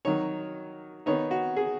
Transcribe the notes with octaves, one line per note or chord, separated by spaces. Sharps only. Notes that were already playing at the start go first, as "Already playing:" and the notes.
D#3 F#3 D#4 C#5
D#3 B3 D#4 C#5
F#4
G#4